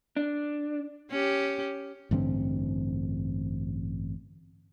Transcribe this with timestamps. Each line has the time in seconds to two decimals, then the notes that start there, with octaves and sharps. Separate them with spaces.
0.17 D4
1.11 C#4 G4
2.11 A1 G2 D3 C4